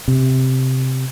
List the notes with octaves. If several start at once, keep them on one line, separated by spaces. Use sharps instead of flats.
C3